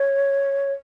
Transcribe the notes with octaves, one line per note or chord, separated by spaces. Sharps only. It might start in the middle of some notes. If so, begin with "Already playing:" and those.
Already playing: C#5